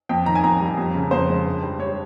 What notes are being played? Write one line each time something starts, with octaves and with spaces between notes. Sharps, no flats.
F2 G5
D#3 A#5
G#5
F2 A#5
G3
F2
C#3
F2 C5
G#3
G2
G3
G3 C#5